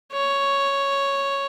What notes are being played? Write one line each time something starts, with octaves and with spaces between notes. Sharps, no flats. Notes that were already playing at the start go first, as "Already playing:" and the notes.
C#5